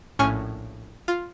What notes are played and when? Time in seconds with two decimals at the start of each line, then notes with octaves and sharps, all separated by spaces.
0.19 A#1 A2 C#4 G#5 C#6 F6
1.08 F4